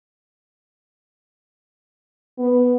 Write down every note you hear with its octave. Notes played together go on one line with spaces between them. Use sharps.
B3